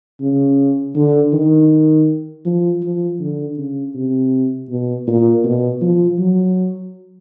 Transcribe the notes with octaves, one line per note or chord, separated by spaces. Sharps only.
C#3
D3
D#3
F3
F3
D3
C#3
C3
B2
A#2
B2
F3
F#3